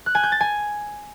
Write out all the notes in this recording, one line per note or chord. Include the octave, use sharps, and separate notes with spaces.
F#6
G#5
G6
A6
G#5